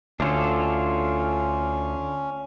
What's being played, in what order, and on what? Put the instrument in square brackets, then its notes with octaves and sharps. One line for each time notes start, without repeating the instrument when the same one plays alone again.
[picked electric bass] D2 [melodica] C#4 [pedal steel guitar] D4 F4 A4